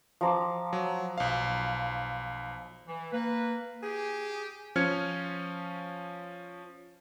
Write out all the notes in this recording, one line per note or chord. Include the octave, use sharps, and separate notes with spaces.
F3 A#5 D6
F#3
B1 F5
E3
A#3 B4
G4 G#4
F3 C#4 F6 G#6 C#7